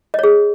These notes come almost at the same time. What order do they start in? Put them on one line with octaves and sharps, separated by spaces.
D#5 C#5 G#4